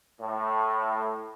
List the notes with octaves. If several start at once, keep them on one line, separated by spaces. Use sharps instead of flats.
A2